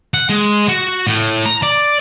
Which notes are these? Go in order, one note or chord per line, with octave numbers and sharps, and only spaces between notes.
F#5
G#3
F#4
A2
A#5
D5